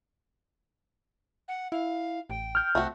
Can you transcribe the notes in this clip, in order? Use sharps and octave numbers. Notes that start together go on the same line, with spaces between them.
F#5
E4 F5
A1 G5
F6 G6
C2 A3 C4 F#4